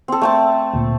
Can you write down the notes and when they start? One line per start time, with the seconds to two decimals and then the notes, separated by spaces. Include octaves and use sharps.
0.08 C4 A4
0.22 A3 C4 A5
0.74 D2 A#2